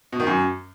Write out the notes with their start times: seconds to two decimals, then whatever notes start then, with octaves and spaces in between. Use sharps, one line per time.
0.13 B2
0.20 D#3
0.27 F#2